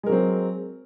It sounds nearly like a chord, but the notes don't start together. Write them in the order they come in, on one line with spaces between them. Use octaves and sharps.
G#3 A#4 F#3 C4